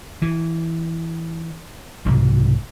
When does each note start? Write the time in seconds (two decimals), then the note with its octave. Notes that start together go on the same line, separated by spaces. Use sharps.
0.22 E3
2.05 C2 G#2 B2 F#3